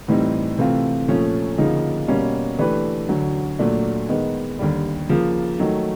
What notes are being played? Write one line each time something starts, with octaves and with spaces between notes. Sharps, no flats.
A2 E3 G3 C4 D#4
C3 E3 A3 C4 F4
A#2 F3 A3 C#4
D2 C#3 F3 A#3 D#4
B2 G3 A#3 C#4
E3 A3 D4 G4 B4
D2 D3 F#3
A#2 F#3 A3 D4
D#3 G#3 B3
D#2 D3 G3
C#3 F3 A#3
D#3 F#3 A3